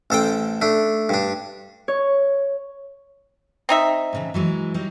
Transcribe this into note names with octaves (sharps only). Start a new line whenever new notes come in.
A1 A4 C5 G5
A3 D4
G2 D4
C#5
C4 D#4 E5
A2 C#3 E3
E3 F#3 G#3
F#3 G3 D#4